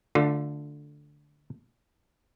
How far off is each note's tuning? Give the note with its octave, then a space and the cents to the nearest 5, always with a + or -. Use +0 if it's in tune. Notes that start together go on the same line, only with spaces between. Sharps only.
D3 +0 A3 +0 F4 +30